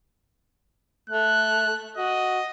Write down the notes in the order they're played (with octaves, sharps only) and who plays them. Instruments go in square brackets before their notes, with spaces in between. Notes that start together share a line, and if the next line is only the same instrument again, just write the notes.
[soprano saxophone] A3 [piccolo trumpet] F#6
[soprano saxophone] F#4 [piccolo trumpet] D#5